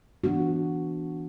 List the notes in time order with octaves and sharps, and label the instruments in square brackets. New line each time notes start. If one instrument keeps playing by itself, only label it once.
[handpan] E3 B3 D4 F#4